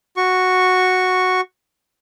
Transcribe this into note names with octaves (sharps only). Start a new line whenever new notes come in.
F#4 C#6